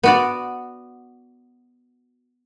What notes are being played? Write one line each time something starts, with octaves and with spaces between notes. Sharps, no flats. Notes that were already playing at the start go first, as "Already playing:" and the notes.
B3 F#4 D5